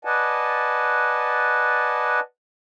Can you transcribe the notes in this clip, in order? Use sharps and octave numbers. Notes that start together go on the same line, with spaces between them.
B4 D5 D#5 F#5 G#5 A5